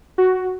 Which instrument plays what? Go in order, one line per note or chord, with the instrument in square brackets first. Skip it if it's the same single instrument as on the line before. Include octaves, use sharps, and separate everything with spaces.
[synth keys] F#4